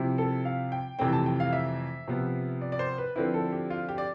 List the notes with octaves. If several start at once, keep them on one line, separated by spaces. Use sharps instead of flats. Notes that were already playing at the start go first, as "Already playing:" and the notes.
Already playing: C3 F3 C4 E4
A4
F5
G5
F2 C3 E3 A3 C4 G5
A5
G5
F5
E5
C3 F3 B3
D5
D5
C5
B4
D3 F3 C4 E4 B4
A4
G4
F4
G4
D5